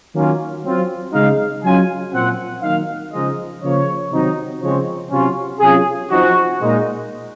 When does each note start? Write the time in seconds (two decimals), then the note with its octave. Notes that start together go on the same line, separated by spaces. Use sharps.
0.14 D#3 F#3 A#3 C#4 F4
0.64 F#3 C4 F4
1.13 C#3 G#3 D#4 F5
1.64 F#3 C#4 F4 G#5
2.13 A#2 F3 C4 F#5
2.62 D#3 F#3 A#3 D#4 F5
3.12 C#3 F3 G#3 D#4 D#5
3.63 C#3 F3 A#3 C#5
4.11 C3 D#3 F#3 C4 D#4
4.62 C#3 F3 G#3 C4 C#5
5.11 C3 F#3 C#4 F4
5.61 C3 F#3 C#4 F4 G#4
6.11 F3 C4 D#4 F#4
6.61 A#2 G#3 D#4